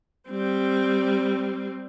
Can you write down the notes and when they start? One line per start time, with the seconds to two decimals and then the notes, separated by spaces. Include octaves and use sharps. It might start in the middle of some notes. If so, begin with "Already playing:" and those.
0.30 G3 C4